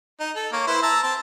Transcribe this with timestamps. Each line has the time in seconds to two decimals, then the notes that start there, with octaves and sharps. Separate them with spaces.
0.20 D#4
0.36 A4
0.53 A#3 C#5
0.67 E4 B4 C5
0.83 A5 A#5 E6
1.03 C4 A5